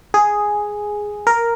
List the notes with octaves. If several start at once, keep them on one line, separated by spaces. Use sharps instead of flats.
G#4
A#4